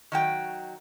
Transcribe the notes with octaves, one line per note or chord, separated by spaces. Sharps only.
D#3 F#3 G5